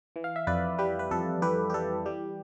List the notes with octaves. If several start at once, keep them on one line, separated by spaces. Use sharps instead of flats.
E3
F5
E5
F2 B4 D5
G3 G4 B4
B4
F2 A4
E3 G4 B4
G4
G3 A4
G3 G4